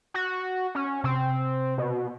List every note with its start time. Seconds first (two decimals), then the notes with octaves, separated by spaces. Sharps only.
0.14 F#4
0.75 C#4
1.04 C3 C4
1.78 B2